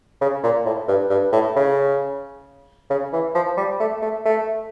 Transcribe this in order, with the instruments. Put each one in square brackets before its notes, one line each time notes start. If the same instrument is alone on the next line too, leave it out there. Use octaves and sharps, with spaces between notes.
[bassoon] C#3
A#2
A2
G2
G2
A2
C#3
C#3
E3
F3
G3
A3
A3
A3